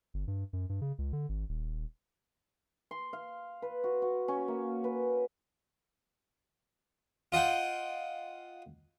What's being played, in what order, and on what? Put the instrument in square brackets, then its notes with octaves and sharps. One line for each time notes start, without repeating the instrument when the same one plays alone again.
[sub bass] G1
G2
F#2
G2
C#3
C#2
D3
G#1
D#1
[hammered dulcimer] C6
F5
B4
F#4
F#4
C#4
A#3
B4
[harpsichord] F4 D#5 F#5 G5